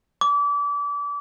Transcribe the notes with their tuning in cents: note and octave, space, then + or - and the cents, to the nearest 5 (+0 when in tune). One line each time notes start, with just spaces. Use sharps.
D6 -30